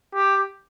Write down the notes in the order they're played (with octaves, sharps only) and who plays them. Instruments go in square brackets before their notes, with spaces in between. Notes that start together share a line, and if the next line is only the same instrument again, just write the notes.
[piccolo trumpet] G4